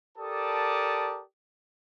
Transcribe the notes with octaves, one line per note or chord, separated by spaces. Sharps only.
G4 A4 A#4 D5 A5 D#6